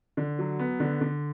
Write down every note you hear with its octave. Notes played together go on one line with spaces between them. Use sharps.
D3
F#3
B3
D3
D3